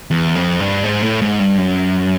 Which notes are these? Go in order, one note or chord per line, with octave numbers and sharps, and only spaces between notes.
E2
F2
G2
G#2
A2
G#2
G2
F#2